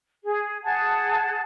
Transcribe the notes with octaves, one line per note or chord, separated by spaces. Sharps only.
G#4
G#4 F#5 A5